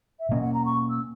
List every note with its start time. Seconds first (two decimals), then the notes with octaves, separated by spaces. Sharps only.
0.19 E5
0.29 B2 A#3 C#4 D#5
0.41 F#5
0.53 A#5
0.65 C#6
0.89 E6